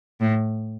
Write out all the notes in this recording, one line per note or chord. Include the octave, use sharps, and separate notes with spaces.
A2